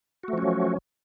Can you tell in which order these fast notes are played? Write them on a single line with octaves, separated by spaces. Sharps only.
F#4 A3 F3 C#4 F#3